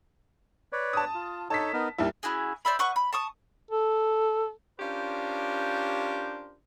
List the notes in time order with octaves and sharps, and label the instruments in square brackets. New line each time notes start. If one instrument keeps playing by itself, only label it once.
[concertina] B4 C#5 D5
[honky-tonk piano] A5 D#6
[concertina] F4
[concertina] D#4 A4 C#5 [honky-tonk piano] A5 B6
[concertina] B3 D#4 A#4
[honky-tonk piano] D#2 G3 E4 [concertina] A5
[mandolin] C#4 E4 F#4 G#4
C5 D5 E5 B5
B4 F#5 C#6 F#6
B5
A5 C#6 D#6
[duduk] A4
[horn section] C#4 D4 F4 G4 A#4 C5